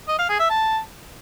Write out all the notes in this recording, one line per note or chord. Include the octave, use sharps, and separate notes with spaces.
D#5
F5
G#4
E5
A5